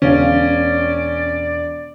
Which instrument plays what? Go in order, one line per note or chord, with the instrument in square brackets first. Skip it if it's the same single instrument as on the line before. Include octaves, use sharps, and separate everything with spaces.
[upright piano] E1 F5 [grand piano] C#4 [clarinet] D5